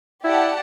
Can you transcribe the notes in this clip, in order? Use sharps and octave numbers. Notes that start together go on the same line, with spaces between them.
E4 G4 D5 F#5 A5